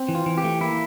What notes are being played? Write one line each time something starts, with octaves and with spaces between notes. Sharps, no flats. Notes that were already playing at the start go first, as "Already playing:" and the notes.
Already playing: C4
E3
F4
E3
G4
A3
A#3 E4